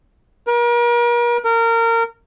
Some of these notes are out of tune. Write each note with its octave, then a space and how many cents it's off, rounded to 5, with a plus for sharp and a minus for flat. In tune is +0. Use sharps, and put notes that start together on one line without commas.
A#4 +40
A#4 -25